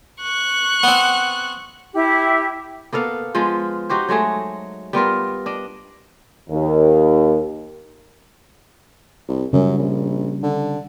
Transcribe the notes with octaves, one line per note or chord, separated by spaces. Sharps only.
C#6 F#6
B3 C4
E4 G4
A#3 B3 A4 F5
F3 G#3 B3 F4
D#4 F#4 G4 C5
F#3 G#3 A3 G#4
G3 B3 F4 A#4
D4 D#5
D#2
C2
F#2 C#3 G3
A#1
D3